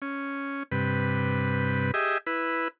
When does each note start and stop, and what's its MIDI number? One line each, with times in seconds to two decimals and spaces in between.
0.02 0.63 61
0.72 1.91 43
0.72 1.91 48
0.72 1.91 71
1.94 2.18 67
1.94 2.18 68
1.94 2.18 75
1.94 2.18 76
2.27 2.68 64
2.27 2.68 71